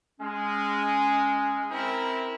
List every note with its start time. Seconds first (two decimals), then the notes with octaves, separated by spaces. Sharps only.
0.20 G#3 C#4
1.70 C4 E4 A#4